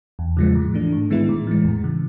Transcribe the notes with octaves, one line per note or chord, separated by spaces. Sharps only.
E2
C#3 F3 G#3
A2
E3 A3 D4
G#2
D#3 G#3 B3 E4
A2
E3 G#3
F2
C#3 E3